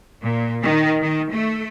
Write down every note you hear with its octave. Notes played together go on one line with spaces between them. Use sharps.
A#2
D#3
D#3
A3